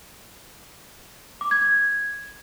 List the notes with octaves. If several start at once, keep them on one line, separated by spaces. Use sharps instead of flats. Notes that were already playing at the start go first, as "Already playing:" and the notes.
D6
G#6
G#6